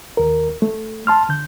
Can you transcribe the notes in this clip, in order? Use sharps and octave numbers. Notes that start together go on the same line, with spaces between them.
D#2 A#4
A3
A5 C6 F6
D3 G6